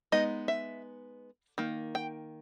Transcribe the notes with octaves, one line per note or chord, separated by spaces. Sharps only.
G#3 B3 D#4 D#5
E5
D#3 A#3
G5